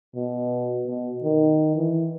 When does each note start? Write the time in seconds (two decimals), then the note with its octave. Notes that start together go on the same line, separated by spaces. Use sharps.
0.16 B2
0.87 B2
1.24 D#3
1.76 E3